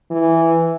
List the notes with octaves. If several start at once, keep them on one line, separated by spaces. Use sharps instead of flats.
E3